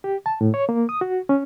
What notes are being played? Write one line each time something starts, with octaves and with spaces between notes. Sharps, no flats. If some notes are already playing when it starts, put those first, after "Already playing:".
G4
A5
A2
C#5
A#3
D#6
F#4
C#4